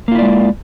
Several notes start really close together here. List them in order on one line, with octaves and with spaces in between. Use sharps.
A#3 F4 E4 D5 G#3